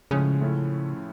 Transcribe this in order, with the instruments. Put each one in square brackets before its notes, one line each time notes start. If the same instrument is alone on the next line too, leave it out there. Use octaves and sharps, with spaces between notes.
[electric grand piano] A2 F3 G#3 C#4 [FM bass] C#3
[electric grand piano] A2 F3 A3 C#4 E4